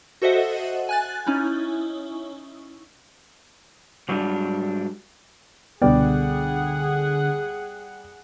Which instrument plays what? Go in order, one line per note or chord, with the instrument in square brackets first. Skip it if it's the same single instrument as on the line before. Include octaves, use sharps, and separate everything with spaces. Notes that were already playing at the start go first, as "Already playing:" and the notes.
[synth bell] F#4 A4 C5 D#5 E5 F#5
G#5 F#6 A6
C#4 D#4 E4
[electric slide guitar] G#2 F#3 G3 A3 D4 F4
[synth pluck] C#2 B2 B3 [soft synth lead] D3 [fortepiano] G3 D5 [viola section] G#4 F#5